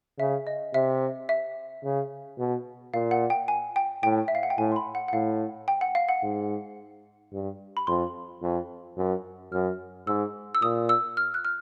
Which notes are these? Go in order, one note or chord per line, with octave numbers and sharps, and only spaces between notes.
C#3 E5
D#5
C3 E5
E5
C#3
B2
A#2 F5
F#5
G5
G#5
G5
A2 G5
E5
F5
F#5
G5
A2 G#5
C6
B5
F#5
F#5
A2 F5
G5
F#5
F5
F#5
G#2
G2
B5
F2 C6
F2
F#2
F#2 F6
G#2 E6
E6
A#2 D#6
E6
F6
F#6
F6